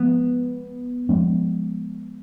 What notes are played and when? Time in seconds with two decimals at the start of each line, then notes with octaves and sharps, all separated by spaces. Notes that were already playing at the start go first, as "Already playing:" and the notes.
Already playing: F3 G#3 B3
1.09 F3 G#3 C#4